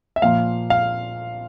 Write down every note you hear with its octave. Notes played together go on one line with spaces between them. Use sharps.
E5
A#2 F3 A#3 F5
F5